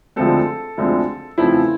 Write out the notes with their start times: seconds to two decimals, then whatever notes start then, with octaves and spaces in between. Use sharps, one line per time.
0.16 D2 D3 F3 G#3 C4 A4
0.78 D2 D3 F3 G#3 C4
1.38 E2 C#3 F3 A3 C4 E4